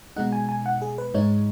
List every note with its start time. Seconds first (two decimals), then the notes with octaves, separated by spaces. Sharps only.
0.16 B2 G#3 D#4 F#5
0.32 G#5
0.49 G#5
0.66 F#5
0.82 G#4
0.98 B4
1.14 G#2 G#3 D#4 C#5